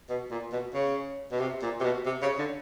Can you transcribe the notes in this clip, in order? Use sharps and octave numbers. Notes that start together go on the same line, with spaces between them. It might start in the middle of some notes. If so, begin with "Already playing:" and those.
B2
A#2
B2
C#3
B2
C3
A#2
C3
B2
C3
C#3
D3